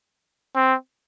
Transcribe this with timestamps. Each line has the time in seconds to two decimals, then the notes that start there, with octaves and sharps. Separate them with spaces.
0.56 C4